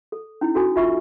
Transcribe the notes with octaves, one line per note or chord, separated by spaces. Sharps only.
A4
C#4 D#4 E4
C#4 F#4 A4 G#5
F4 E5 C#6